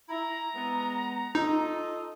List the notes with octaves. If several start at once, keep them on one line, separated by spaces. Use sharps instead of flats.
E4 A#5
G#3 B3
D#4 F4 A4 D#5